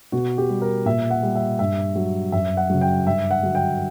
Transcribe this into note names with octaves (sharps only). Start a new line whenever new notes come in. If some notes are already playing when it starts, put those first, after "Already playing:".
B2 F#4
G4
G3
A#4
A#2 E5
F#5
G3
E5
G2 E5
F#3
F#2 E5
F#5
C#3 F#3
G5
G2 E5
F#5
D3 F#3
G5